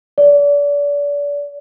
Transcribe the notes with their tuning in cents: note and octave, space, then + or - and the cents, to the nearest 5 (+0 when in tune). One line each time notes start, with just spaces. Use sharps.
D5 -35